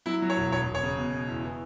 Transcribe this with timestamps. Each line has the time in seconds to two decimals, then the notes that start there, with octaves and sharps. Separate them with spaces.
0.06 F#3 E4
0.22 F#3
0.30 C#5
0.37 E1
0.52 E1 C#5
0.67 E1
0.74 C#5
0.83 C#3
0.97 B2
1.13 B2
1.28 E2
1.44 E3